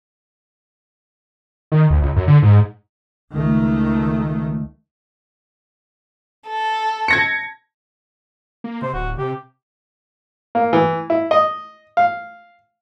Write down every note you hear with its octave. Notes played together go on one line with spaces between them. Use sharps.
D#3
D2
C#2
F#2
D3
G#2
C#2 D#3 A3
A4
G#6 A#6 C#7
A#3
C3 C5
D1 F#4
C3 G4
A#3
E3
E4
D#5
F5